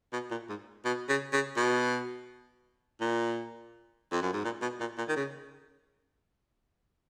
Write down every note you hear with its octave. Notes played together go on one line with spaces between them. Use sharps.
B2
A#2
G#2
B2
C#3
C#3
B2
A#2
F2
F#2
G#2
A#2
B2
A#2
A#2
D#3
C#3